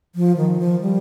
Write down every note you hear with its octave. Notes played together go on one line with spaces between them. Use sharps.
F3
D#3
F3
G3